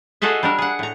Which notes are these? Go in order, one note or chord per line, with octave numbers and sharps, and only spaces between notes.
F4 F#4 G#4 A4 D#5 E5
G3 D4 A#4
G#4 F#5
A2 A#5